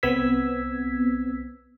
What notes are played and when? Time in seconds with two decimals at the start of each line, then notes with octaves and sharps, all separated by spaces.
0.03 C2 B3 C4 E6 G#6 B6